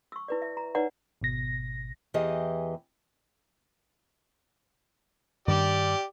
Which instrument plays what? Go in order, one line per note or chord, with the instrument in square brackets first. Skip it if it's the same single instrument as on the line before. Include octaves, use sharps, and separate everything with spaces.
[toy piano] C#6 E6
E4 B4 D5
E5
A#5
D#4 B4 C#5 D5 F#5 A#5
[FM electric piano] G#1 B2 A#6
[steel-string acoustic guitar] E2 E3 G4 G#4 D#5
[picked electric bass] G2 D#3 [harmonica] G4 D5